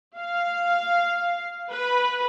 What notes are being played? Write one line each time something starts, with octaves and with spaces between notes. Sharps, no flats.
F5
B4